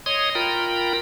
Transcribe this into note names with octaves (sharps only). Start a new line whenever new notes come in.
C#5 D#5 C6 D#6
F4 A#4 G5 A#5 B5